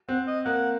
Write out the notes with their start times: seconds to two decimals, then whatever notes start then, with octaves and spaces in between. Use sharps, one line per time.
0.09 C4 F#5
0.27 D#5
0.45 A#3 F#5